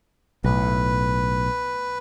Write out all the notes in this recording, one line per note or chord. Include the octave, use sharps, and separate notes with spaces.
B1 A2 B4